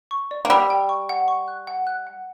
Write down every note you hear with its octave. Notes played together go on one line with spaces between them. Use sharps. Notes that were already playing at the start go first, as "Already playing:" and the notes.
C#6
D5
A#3
G3 E6
G5
C#6
F#5
C#6
F#6
F#5
F#6
F#5